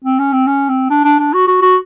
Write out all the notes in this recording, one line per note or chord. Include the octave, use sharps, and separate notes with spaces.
C4
C#4
C4
C#4
C4
D4
D4
D4
F#4
F#4
F#4